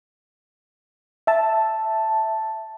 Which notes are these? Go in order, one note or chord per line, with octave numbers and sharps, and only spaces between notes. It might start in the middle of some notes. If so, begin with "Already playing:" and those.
E5 A5